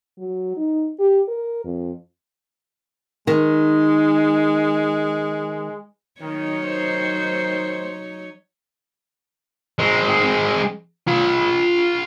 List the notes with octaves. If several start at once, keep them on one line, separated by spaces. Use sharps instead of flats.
F#3
D#4
G4
A#4
F2
D#3 G#3
D#3 F#3 D#4 C#5
D#3 C5
G#3 C4
F4 B5